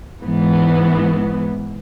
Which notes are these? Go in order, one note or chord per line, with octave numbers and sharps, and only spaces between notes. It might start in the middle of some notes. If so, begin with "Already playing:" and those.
G#2 E3 B3